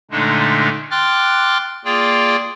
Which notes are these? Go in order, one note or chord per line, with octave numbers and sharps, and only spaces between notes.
A#2 D3 G#3 A3 D4 D#4
G5 C6 D6 F6 F#6 A6
A#3 F4 G#4 D5 G5